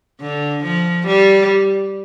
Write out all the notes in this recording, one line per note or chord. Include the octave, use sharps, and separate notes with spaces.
D3
F3
G3